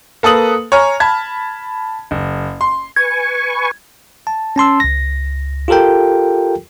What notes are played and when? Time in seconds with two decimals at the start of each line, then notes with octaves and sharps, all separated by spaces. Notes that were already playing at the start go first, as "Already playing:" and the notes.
0.23 A#3 A4 B4 D#6 F#7
0.72 C#5 G#5 A#5 F6
1.00 A5 B5 G#6
2.11 F#1
2.61 C6
2.96 B4 G#5 C#6 G#6
4.27 A5
4.56 C#4 A5 C6 E6
4.80 C#2 A#6
5.68 F4 G4 A4 A#4 G5